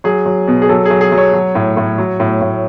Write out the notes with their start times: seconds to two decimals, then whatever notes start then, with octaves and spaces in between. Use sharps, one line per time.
0.04 F#3 G#4
0.26 F#3
0.48 B2
0.62 G#4
0.69 F#3 A4
0.86 G#4
0.91 F#3
1.01 G#4
1.12 F#3
1.18 C#5
1.33 F#3
1.55 A2
1.77 A2
1.98 F#3
2.20 A2
2.41 A2